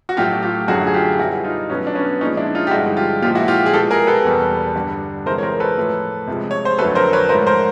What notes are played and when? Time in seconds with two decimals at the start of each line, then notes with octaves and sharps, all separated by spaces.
0.09 F#4
0.17 A2 F#3 A3 F4 G4
0.43 F4 G4
0.68 F#2 D3 F#3 A3 F#4 G#4
0.87 G#4
0.94 F4 G4
1.19 B2 G3 E4 F#4
1.44 D#4 F4
1.70 B2 F#3 A3 B3 C#4
1.87 D4
1.95 B3 C#4
2.21 A#2 F3 G#3 C#4 D#4
2.37 D4 E4
2.55 D#4 F4
2.67 G4
2.71 G2 D3 F3 G#3 E4 F#4
2.97 F4 G4
3.22 A#2 F3 G#3 F4 G4
3.35 E4 F#4
3.48 F4 G4
3.66 G#4
3.73 B2 G#3 G4 A4
3.91 G#4 A#4
4.07 A4 B4
4.24 E2 B2 G3
4.75 G2 D3 G3
5.26 C3 E3 G#3 A#4 C5
5.38 C#5
5.43 A#4 C5
5.60 A4 B4
5.77 A2 F3 A3
6.28 C3 F3 G#3
6.51 C#5
6.65 C5
6.78 F2 D3 F#3 A3 A4 B4
6.95 A#4 C5
7.13 B4 C#5
7.29 G#2 F3 A3 A#4 C5
7.47 A#4 C5